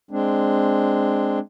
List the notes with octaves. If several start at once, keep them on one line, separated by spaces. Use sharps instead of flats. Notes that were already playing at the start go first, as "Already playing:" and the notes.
G#3 C4 D4